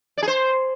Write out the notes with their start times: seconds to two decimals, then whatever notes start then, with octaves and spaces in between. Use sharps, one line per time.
0.17 D5
0.23 G#4
0.28 C5